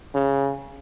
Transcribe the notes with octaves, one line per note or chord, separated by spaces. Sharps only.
C#3